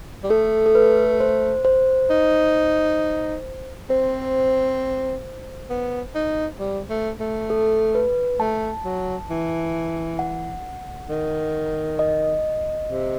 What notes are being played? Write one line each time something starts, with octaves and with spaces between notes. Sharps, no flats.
G3
A3 A4
A4
B4
C5
C5
D#4
C4 C5
B3
D#4
G3
A3
A3
A4
B4
A3 A5
F#3
E3
F#5
D#3
D#5
C3